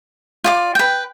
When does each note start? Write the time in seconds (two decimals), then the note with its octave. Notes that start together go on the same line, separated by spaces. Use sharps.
0.44 F4 D5 D6
0.75 B4 G5